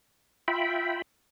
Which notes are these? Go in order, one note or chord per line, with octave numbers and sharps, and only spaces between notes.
F4 E5 G5 B5